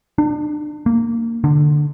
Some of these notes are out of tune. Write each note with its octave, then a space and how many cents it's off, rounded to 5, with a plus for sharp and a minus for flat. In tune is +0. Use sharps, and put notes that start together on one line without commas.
D4 +35
A#3 -15
D3 +15